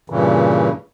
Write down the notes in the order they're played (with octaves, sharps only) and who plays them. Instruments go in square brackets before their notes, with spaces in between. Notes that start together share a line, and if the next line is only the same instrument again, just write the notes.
[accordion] G2 A#2 C#3 E3